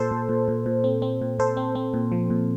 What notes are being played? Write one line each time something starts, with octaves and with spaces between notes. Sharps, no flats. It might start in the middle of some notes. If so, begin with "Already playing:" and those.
Already playing: A#2 A4 C5
A#2
A#2
A#2
A#2
C4
C4
A#2
A#2 A4 C5
C4
C4
A#2
F3
A#2